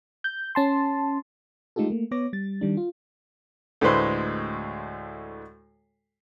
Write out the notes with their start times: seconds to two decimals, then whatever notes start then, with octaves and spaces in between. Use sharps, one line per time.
0.24 G6
0.55 C#4 A5 C6
1.76 G#3 A3 D#4 F4 G4 A4
1.90 A3 A#3
2.11 B3 C#5 D6 A#6
2.33 G3 A6
2.61 D#3 G3 D4
2.77 F4
3.81 D2 A2 G#3 B4 C5